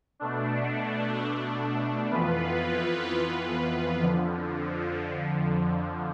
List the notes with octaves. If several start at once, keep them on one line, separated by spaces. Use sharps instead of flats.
B2 A3 D4
F2 E3 B3 F4 B4
F2 D3 F3